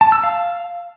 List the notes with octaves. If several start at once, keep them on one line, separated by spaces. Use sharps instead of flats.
A5
E6
F5